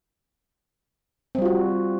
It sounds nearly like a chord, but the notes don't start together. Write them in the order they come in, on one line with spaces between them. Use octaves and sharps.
C4 G3 F4 F#4